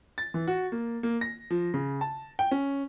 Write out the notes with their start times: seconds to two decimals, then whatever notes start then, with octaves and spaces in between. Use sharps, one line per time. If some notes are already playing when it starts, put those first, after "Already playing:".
0.18 A6
0.34 E3
0.48 F#4
0.72 A#3
1.03 A#3
1.21 A#6
1.50 F3
1.74 C#3
2.01 A5
2.39 G5
2.51 C#4